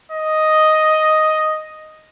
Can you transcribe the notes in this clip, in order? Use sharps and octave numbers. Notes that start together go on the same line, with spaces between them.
D#5